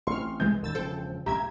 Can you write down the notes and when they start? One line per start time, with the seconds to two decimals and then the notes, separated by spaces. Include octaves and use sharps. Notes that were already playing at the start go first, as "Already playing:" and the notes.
0.07 A1 C4 C6 C#6 F6
0.40 C2 E3 G#3 G6
0.62 D#1 D#2 E6 A6
0.75 E1 C#3 F3 A4 C5 G5
1.26 D#1 G#1 G4 E5 A#5 G#6